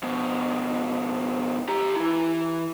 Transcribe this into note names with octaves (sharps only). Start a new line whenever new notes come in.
F2 B2
G4 A#5
E3 E4